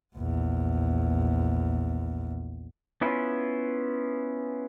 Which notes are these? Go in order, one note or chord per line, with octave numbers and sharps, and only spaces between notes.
A#1 E2
B3 C#4 E4 F4